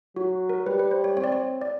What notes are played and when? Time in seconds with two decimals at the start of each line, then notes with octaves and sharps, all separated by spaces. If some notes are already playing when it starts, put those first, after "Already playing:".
0.16 F#3 F#4
0.50 A#4
0.66 G3 B4
0.79 B4
0.91 C5
1.04 C#5
1.16 C4 C#5
1.24 D5
1.32 C#5
1.61 D5